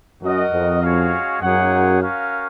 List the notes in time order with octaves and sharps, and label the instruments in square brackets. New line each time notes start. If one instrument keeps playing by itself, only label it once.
[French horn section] F#2 [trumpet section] F#4 A#4 D#5 F#5
[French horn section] F2
[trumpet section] G#3 C#4 F#4 C#5 F5
[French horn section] F#2 [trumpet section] A#3 D#4 G#4 C#5 F#5
[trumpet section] C#4 F#4 A#4 F5